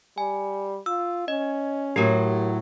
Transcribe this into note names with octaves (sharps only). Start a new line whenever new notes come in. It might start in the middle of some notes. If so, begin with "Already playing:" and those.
G3 G#5
F4 E6
C#4 D#5
A2 F#3 G4 A#4